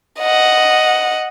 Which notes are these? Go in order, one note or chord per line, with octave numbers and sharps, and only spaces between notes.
D#5 F#5